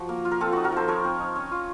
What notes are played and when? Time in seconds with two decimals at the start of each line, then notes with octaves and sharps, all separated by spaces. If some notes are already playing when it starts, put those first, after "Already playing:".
Already playing: F3 F#4
0.09 A#3
0.25 F4
0.31 A#4
0.40 C4 F4 A4
0.52 D#4 F#4
0.64 F#4 A#4
0.72 F3 A4 C5
0.88 F3 A#4 C#5
1.04 C4
1.20 D#4
1.36 C#4
1.51 F4